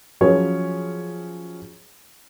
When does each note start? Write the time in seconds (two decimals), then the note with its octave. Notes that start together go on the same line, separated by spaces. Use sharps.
0.21 F3 F#3 C#4 F4 G#4 C#5